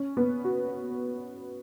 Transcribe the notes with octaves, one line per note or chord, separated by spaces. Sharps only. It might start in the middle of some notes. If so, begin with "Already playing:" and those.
Already playing: C#4
B3
F#4